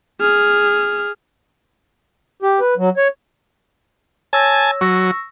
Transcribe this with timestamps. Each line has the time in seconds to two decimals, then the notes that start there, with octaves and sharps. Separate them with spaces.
0.21 G#4 F6
2.43 G4
2.60 B4
2.77 F#3
2.97 C#5
4.33 C#5 G#5 A5 E6 A#6
4.81 F#3 C#6 E6 A#6